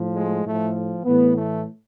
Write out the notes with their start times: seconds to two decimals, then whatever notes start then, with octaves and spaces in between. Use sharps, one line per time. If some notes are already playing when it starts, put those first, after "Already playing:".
Already playing: A2 F3
0.15 G#3
0.44 A2 F3 A3
1.04 A2 E3 B3
1.35 A3